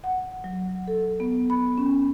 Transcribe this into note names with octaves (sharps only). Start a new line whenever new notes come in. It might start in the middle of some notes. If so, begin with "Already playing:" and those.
F#5
F#3
A4
B3
B5
C#4